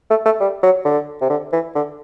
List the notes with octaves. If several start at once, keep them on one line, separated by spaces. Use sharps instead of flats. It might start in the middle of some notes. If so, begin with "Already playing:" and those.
A3
A3
G3
F#3
D3
C3
D3
E3
D3